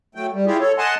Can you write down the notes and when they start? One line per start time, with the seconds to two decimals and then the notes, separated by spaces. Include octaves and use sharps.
0.15 F#3 A3 G5
0.33 G3
0.46 E4 F4 G4 G#4
0.60 A4 C#5
0.78 D#5 F#5 G#5 A5 C6